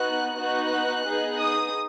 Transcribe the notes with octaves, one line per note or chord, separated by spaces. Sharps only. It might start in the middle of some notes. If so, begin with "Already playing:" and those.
Already playing: B3 D#4 F#4 F#6
B3 D#4 F#4 F#6
B3 D#4 G#4
D#6